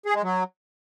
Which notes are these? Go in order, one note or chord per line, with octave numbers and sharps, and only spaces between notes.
G#4
G#3
F#3